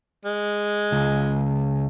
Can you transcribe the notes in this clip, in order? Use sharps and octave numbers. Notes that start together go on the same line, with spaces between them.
G#3
C#2